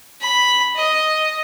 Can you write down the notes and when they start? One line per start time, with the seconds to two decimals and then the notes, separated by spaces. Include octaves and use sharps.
0.21 B5
0.76 D#5